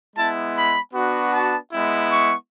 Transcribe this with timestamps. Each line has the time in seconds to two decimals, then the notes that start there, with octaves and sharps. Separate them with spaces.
0.16 G#3 B3 E4 A5
0.55 B5
0.93 B3 D4 F#4
1.33 A5
1.72 G#3 B3 E4
2.10 C#6